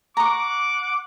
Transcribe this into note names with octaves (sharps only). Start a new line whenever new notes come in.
F#5 A#5 C#6 D6